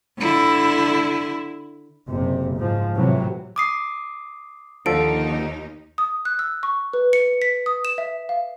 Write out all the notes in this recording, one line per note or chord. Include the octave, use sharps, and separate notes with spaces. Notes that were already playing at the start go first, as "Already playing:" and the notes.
D3 E4
F#1 C3
G#2 F3
A2 C3 E3 F#3
D6 D#6 C7
D#2 D3 F3 D#4 A4 D7
D#6
F#6
E6
C#6
B4
C#7
B6
D#6
E7
E5
F5